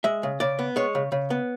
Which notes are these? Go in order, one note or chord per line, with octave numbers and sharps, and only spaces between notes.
G#3 E5
C#3
C#3 D5
B3
G#3 C#5
C#3
C#3
B3